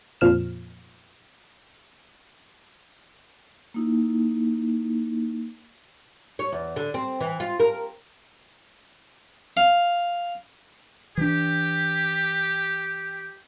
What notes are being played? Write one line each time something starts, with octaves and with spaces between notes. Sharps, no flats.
F2 A#2 F3 F6 E7
A#3 D#4 E4
C#5
E2
D3
C4
E3
F4
A#4
F5
E3 D4 G4